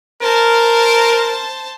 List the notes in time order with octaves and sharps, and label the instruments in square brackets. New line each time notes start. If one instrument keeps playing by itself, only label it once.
[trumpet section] A#4 [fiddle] C5 A5